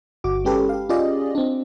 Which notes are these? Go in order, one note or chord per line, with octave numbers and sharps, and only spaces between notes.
G1 F#4 D6
G#3 C#4 G4 A4 B4
G4 F5
C#4 F4 G4 G#4 D5 D#5
C4 D4